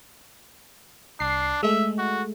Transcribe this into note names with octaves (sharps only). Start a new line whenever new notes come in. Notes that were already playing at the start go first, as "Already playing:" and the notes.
C2 D4 C7
G#3 A3 E5
F#4